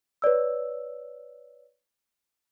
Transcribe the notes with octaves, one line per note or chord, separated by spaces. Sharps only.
B4 C#5 D5 E6